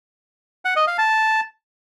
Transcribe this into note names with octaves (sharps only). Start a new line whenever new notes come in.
F#5
D#5
F5
A5